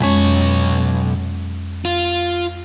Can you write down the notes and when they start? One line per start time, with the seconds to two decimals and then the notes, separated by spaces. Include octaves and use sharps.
0.01 B1 F2 G#3 C#4 C#5
1.85 F4